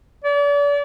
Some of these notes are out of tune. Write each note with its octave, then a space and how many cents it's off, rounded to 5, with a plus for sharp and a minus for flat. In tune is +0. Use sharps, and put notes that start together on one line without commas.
D5 -40